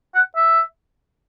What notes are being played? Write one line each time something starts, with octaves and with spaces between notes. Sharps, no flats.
F#5
E5